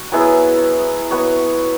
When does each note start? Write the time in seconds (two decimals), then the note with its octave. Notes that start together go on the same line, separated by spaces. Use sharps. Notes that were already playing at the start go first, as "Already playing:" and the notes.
Already playing: F#4
0.12 F#3 B3 E4 G#4
1.11 B3 F#4 C#5